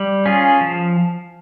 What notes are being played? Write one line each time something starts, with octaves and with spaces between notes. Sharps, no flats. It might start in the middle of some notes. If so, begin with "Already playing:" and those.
Already playing: G3
C#4 F4 G#4
F3